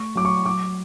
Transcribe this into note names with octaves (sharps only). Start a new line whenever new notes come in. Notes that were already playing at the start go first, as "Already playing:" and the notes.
Already playing: A3 C#6
F#3 D6
C#6
F#3 D6